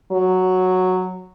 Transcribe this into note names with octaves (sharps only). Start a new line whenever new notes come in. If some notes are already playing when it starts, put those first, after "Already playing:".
F#3